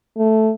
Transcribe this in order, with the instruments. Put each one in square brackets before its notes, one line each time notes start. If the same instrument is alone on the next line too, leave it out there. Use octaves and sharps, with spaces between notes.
[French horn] A3